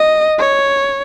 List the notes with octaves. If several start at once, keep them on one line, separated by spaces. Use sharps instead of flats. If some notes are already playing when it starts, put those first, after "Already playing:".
Already playing: D#5
C#5